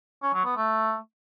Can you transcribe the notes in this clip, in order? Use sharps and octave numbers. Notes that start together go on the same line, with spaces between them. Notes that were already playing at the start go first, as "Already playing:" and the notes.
C#4
F#3
B3
A3